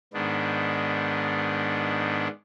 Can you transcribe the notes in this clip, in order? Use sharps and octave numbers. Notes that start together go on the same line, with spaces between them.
G#2 D#3 B3 D4